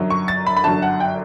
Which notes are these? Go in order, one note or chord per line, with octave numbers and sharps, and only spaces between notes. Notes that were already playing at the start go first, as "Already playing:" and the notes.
Already playing: G1 F#2 D3 F#3
C#6
A6
B5
B5
G1 F#2 D3 F#3 A5
F#5
G5